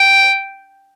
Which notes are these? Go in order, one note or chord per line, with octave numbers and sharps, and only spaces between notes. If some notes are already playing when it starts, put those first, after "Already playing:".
Already playing: G5